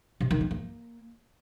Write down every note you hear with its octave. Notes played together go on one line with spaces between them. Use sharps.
C3
D#3
B3
A#3